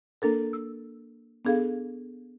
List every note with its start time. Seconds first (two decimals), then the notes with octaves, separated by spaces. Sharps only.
0.22 A#3 D4 A4 A#4
0.53 E6
1.45 B3 D4 G#4 A4 F5